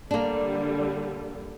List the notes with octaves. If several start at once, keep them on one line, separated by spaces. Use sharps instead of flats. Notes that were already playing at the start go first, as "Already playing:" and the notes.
D3 G3 A#3 D4